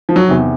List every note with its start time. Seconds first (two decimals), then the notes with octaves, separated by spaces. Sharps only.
0.09 F3
0.16 F#3
0.27 E2 C3 D#3